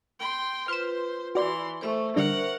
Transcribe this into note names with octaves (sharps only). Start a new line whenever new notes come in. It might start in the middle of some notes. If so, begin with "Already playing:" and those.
G5 C6
F4 B4 C5 F6 E7
E3 F#4 D5 C6
A3 C5 E5 C#6
D3 G3 D4 A#4 F#5